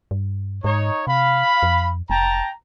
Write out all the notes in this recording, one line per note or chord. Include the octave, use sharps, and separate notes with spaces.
G2
G#2 D#4 C#5
C3 F5 B5
F2
F1 G5 A5 A#5